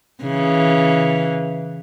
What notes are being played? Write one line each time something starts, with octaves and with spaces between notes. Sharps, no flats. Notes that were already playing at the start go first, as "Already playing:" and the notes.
C#3 E3